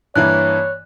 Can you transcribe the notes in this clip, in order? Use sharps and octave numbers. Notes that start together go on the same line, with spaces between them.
G2 E3 A#3 C#5 F#6